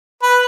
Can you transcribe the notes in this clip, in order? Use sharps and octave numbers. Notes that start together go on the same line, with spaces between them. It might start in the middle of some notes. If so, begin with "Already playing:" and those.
B4